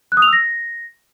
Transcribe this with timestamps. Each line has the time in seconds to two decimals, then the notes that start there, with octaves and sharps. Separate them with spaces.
0.12 F#6
0.17 D#6
0.22 F7
0.27 E6
0.33 A#6